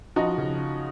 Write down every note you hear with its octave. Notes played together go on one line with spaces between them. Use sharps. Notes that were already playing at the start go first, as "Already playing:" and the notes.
F3 D#4 F#4
C#3